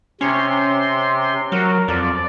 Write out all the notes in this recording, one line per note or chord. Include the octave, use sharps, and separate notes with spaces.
C3 C#4 C6
F#3 A#4
F2 D5